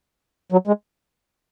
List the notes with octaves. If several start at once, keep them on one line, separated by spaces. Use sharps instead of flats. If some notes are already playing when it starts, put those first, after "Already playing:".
F#3
G#3